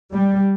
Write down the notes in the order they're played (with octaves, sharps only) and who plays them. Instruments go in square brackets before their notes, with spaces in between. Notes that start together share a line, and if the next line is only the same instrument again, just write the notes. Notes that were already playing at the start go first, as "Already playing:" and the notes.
[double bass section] G3